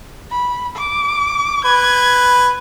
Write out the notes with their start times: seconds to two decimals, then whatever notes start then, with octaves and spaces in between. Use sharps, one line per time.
0.31 B5
0.76 D6
1.65 B4 G#6